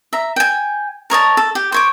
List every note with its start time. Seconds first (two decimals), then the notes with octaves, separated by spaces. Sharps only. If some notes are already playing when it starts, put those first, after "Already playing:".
0.13 E5 A#5
0.36 G5 G#5
1.10 A#4 C#5 D#5 A5
1.37 A4
1.55 G4
1.72 C5 C#5 D6